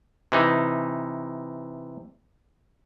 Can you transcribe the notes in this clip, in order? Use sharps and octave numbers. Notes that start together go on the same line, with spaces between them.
C3 E3 D#4